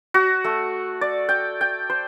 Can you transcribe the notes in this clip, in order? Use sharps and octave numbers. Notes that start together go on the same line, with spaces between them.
F#4
A3
D5
G5
G5
C5